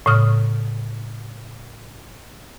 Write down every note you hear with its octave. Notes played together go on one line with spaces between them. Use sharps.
A2 C#3 D#6 F6